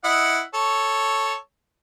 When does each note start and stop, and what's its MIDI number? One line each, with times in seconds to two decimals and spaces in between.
0.04 0.40 64
0.04 0.40 75
0.04 0.40 78
0.54 1.34 69
0.54 1.34 73